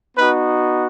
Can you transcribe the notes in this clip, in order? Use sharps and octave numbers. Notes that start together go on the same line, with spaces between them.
B3 D#4 F#4 B4